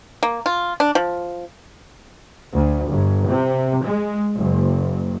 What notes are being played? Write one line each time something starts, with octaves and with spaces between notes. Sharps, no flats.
A#3
F4
D4
F3
D2
G1
C3
G#3
F#1